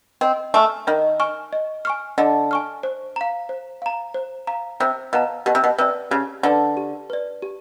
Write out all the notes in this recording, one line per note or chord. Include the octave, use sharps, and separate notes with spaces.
C4 D#5
A3 G#5 C#6 F6
D#3 D#5
G#5 C#6 F6
D#5
G#5 C#6 F6
D3 D#5
G#5 C#6 F6
C5
F5 A#5
C5
F5 A#5
C5
F5 A#5
C3 C5
B2 F5 A#5
B2 G4
C3
B2
C3 B4 D5
C#3 G4
D3 B4 D5
G4
B4 D5
G4